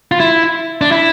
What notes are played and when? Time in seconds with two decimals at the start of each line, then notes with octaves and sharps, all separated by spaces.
0.12 F4
0.20 E4
0.81 D4
0.91 E4